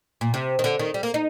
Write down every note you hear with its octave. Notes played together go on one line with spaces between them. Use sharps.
A#2
C3
D#3
D3
D#3
G3
A#3
D#4